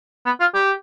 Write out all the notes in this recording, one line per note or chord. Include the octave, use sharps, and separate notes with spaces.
B3
F4
G4